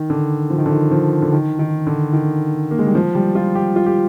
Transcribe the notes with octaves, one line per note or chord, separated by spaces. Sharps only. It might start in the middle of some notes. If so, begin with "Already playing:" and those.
Already playing: D#3
D3
F3
D#3
D3
D#3
F3
D3
D#3
D#3
D3
D#3
A#3
G#3
G3
F3
G3
F4
G4
F4
G4